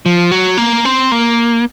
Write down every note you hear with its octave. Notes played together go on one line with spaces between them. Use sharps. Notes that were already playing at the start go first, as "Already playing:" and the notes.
F3
F#3
A#3
C4
A#3